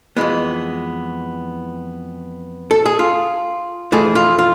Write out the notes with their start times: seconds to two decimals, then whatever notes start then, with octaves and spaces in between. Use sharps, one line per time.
0.17 F2 E3 G#3 B3
2.71 A4
2.85 G#4
2.99 F4
3.92 F2 E3 A3 G#4
4.15 F4
4.39 F4